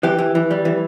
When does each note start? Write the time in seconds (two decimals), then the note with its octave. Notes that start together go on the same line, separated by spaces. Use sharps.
0.03 E3 G4
0.19 E3
0.35 E3
0.51 G3
0.65 E3